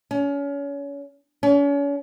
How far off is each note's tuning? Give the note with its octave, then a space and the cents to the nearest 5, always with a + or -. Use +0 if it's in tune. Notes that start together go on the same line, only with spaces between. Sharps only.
C#4 +30
C#4 +40